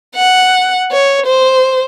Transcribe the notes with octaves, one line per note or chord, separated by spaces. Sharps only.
F#5
C#5
C5